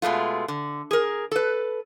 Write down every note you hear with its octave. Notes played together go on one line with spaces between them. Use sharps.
B2 G#3 A3 F4
D3
G#4 A#4
A4 B4